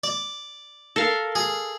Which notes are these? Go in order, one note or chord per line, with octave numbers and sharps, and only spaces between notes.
D5
A4 A#4 F5
G#4